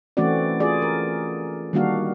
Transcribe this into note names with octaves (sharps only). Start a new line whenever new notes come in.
E3 A3 C4 C#4 F#4 D5
F4 G#4 D5
A#4
D#3 G3 A#3 D4 F#4 F5